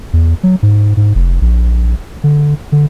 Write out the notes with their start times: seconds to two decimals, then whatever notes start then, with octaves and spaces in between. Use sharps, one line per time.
0.13 E2
0.43 F#3
0.63 G#2
0.97 G#2
1.15 F1
1.42 A#1
2.24 D3
2.72 D3